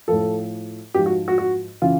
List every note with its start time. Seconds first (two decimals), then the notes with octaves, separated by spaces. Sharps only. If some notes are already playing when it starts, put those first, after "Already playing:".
0.08 A2 F3 A4
0.94 G#2 F3 G4
1.06 F#4
1.28 F#4
1.38 F#4
1.82 C#3 E3 F4